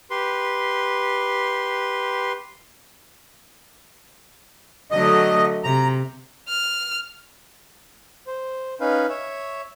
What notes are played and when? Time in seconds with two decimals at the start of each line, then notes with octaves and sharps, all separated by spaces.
0.10 G4 B4 C6
4.91 D3 F#3 A3 D#5
5.64 C3 A#5
6.49 F6
8.27 C5
8.81 C#4 D#4 B4 F5
9.09 C#5 E5